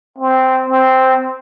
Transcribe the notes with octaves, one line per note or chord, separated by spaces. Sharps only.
C4
C4